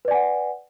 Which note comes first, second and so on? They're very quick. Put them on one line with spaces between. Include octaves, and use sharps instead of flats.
B4 D5 G#5 F#5